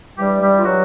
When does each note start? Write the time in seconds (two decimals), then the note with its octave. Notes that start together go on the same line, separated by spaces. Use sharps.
0.17 G2 E3 G3 G4
0.41 G3 G4
0.60 F4
0.64 F#3 F#4